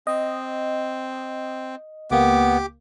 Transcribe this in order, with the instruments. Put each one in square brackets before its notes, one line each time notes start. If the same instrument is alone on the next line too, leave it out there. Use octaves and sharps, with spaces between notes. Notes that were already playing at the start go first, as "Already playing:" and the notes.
[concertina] C4 [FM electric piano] D#5
[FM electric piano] C#2 A#3 [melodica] B3 [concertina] G4 D6